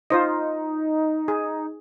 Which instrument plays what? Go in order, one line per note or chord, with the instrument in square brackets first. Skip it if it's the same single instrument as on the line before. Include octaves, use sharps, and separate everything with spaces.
[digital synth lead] D#4 [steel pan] F4 C5 D#5
[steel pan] G#4